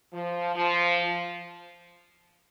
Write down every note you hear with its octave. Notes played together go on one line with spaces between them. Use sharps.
F3
F3